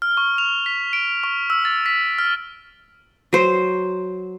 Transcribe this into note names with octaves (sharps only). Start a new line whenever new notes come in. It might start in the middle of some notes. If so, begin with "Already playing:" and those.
F6
C#6
F7
B6
D7
C#6
E6
A6
B6
F6
F#3 C5